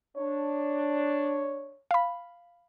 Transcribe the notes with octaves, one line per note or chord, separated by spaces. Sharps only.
D4 C#5
F5 B5